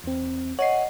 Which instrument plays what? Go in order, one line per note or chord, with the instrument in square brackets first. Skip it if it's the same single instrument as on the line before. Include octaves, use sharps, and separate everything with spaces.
[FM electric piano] E2 C4
[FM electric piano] C#5 C7 [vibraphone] D#5 F#5